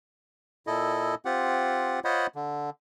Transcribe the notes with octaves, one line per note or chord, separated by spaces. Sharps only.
A#2 E4 A4 D#5
C4 F4 G4 F#5
F4 C5 C#5 D#5 F#5 B5
D3